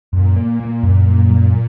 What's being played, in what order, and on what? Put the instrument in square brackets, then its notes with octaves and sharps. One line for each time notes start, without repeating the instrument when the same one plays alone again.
[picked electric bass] F#2 [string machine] A#2
[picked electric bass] A#3
A#3
F#2
F#2
F#2